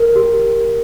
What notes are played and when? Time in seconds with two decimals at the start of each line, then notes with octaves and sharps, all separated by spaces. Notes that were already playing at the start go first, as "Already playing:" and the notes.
Already playing: A#4
0.16 G4